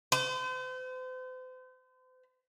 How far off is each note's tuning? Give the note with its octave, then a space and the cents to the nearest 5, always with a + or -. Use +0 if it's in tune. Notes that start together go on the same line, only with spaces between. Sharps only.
C5 -40